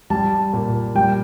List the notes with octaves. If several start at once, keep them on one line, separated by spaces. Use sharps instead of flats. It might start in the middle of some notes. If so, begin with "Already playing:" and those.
G3 A5
A#2
G3 G5